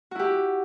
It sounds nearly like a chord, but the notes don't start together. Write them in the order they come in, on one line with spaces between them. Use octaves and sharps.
F#4 E4 G4